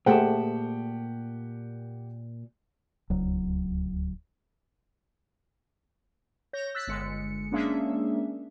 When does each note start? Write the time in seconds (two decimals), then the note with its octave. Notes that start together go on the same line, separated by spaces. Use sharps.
0.06 A#2 A3 G4 G#4 C5 F#5 G5 A5
3.10 D1 C#2 F#3
6.53 C#5 G6 A#6
6.75 E6 F#6 A6 B6
6.87 G1 G#3 C#7
7.51 G#3 A#3 C#4 D4 G#4 E5